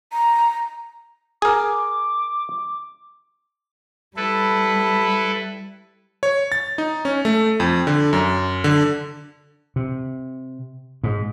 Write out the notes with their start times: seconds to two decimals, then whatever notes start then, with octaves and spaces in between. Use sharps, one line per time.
0.12 A#5
1.42 G#4 A#4 D6
4.17 G3 E4 A4 B4
6.23 C#5
6.52 A6
6.78 D#4
7.05 C#4
7.25 A3
7.60 F2
7.87 D3
8.13 F#2
8.64 D3
9.76 C3
11.04 G#2